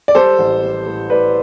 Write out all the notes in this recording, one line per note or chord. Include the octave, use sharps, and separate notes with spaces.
D5
G3 A4 C5
A1
G3
A2
A2 B4 D5